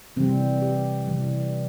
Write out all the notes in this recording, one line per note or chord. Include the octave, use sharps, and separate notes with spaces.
C3 E3 G3 C4
G4
C3 E3 G3